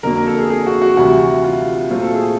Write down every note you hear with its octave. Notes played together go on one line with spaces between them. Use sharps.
F2 D3 F#3 A#3 A#4
A#4
A4
G#4
G#4
F#4
F#4
D2 C3 E3 G3 F#4
F4
A#2 F#3 A3 C4 F4
A4
G#4